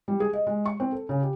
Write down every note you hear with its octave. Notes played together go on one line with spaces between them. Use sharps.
G3
G#4
D#5
G#3
C#6
C4
A4
C#3
G4